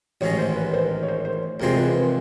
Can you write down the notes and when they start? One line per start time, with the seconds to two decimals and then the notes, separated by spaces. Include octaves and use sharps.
0.21 A1 G#2 D#3 G#3 C#5
0.38 C5
0.56 B4
0.74 C5
0.91 A#4
1.03 C#5
1.08 C5
1.25 C5
1.60 E2 C3 F3 G#3 C4 A#4
1.78 B4
1.95 C5